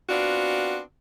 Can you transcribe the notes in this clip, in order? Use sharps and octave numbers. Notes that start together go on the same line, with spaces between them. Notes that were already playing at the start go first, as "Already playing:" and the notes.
B3 C4 D4 F4 F#4